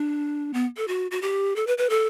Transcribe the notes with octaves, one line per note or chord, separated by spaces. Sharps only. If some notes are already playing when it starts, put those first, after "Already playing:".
Already playing: D4
B3
A4
F#4
F#4
G4
A4
B4
B4
A4